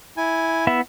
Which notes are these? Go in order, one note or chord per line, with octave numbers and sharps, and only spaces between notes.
E4 G#5
B3 E4 E5